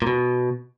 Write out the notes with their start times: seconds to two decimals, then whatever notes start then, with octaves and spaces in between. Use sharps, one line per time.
0.02 A#2
0.07 B2